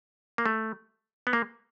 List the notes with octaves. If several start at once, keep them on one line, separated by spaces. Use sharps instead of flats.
A#3
A3
B3
A#3